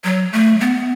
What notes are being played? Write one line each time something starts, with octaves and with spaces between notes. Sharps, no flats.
F#3
A3
B3